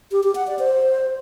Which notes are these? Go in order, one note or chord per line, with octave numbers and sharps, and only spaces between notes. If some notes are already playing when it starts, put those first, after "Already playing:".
G4
G4
F#5
D5
C5